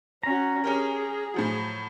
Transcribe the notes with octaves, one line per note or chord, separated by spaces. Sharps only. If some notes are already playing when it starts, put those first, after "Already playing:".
C#4 F#4 A#5
C#4 G4 G#4 A#4
A2 F3 F#3